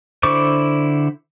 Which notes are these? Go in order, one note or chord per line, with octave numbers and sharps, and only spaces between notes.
D3 E4 C5 C#6 D6